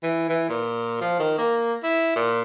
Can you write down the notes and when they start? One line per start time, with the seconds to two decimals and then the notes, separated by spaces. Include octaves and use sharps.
0.03 E3
0.29 E3
0.49 A#2
1.01 F3
1.19 D#3
1.38 A#3
1.83 E4
2.16 A#2